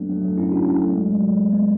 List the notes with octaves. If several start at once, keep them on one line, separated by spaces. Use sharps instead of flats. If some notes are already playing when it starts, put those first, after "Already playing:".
Already playing: F#3 A3 B3 D4
F#3 A3
F#3 A3
C#4 E4
D4 F#4
C#4 E4
F#3 A3
G#3
G#3
F#3
G#3
G#3 B3